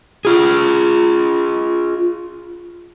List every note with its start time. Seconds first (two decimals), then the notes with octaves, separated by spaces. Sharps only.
0.25 F4 G#4